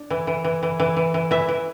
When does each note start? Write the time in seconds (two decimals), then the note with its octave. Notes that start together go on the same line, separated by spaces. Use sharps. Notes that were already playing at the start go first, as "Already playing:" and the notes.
Already playing: D4
0.10 E3
0.27 E3
0.44 E3
0.63 E3
0.80 E3
0.97 E3
1.14 E3
1.31 E3 E5
1.49 E3